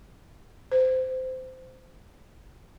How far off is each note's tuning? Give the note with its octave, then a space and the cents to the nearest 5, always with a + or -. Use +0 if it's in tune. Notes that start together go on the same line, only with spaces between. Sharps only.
C5 -20